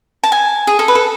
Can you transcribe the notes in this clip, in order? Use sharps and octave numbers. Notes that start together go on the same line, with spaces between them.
A5
G#5
G#4
A4
B4
A4